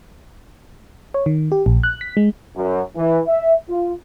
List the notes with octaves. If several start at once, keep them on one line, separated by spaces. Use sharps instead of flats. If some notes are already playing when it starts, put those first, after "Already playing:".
C#5
D#3
G4
A#1
F#6
B6
G#3
F#2
E3
E5
F4